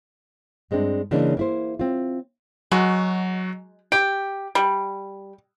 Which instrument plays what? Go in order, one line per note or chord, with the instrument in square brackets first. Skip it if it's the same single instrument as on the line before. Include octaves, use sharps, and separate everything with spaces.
[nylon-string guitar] G2 G#3 C4 D4
C#3 E3 G#3 A#3 C#4 D4
A#3 E4 C5
C4 F4
[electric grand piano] F#3 F#4 [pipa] G#3
[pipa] G4 [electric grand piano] D7
[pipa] G3